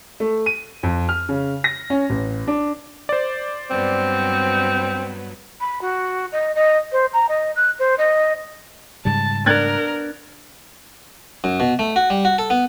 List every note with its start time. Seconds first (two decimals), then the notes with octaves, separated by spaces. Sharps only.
0.20 A3
0.46 D#7
0.83 F2
1.09 F6
1.29 C#3
1.64 A#6
1.90 C#4
2.10 A1
2.47 D4
3.09 C5 D5
3.71 G2 F#3 B3 C4
5.60 B5
5.81 F#4
6.32 D#5
6.55 D#5
6.92 C5
7.13 A#5
7.28 D#5
7.55 F#6
7.79 C5
7.97 D#5
9.05 G#2 C#3 G3 A5
9.46 B3 D4 A#4 F#6 G#6 A6
11.44 F#2
11.60 B2
11.79 A3
11.96 F#4
12.10 G3
12.25 F#4
12.38 A4
12.50 B3